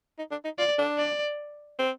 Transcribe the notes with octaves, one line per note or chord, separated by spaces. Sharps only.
D#4
D4
D#4
F4 D5
D4
D5
C4